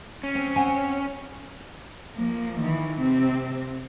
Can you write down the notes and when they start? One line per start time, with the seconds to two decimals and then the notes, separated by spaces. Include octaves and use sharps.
0.23 C#4
0.35 C4
0.56 C4 F#5 G#5
2.16 F3 A#3
2.60 D#3 E3
3.00 C3 C4